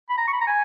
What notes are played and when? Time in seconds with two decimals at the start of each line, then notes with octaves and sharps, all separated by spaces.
0.10 B5
0.18 A#5
0.28 C#6
0.33 B5
0.41 A#5
0.47 G#5